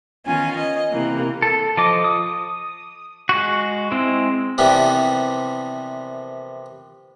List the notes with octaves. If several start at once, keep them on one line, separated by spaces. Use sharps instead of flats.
D#3 B3 C#4 F4 G#5
D#5
C3 E3 A#3
A4
F3 A4 D#5 D6
D#6
G#3 F#4
G#3 C4 E4
C3 E3 F3 G3 A#3 B3